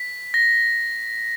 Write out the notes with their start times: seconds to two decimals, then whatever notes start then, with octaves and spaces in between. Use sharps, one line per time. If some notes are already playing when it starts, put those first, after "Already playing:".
Already playing: B6
0.34 A#6